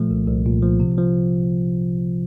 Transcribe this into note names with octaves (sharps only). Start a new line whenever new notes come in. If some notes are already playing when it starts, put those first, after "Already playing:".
Already playing: A#2 F3 A3
C2
C2
A#2
F3
C3
F3